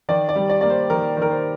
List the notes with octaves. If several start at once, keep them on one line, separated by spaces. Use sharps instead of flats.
D#3 D5
D5
G3
D5
A#3 D5
C5
D#3 A#4
D#3 A#4
C5